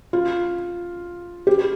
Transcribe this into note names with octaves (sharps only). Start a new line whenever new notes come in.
F4
G4